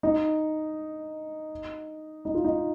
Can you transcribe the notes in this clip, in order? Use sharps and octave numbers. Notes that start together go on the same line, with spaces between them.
D#4
D#4
F4
D#4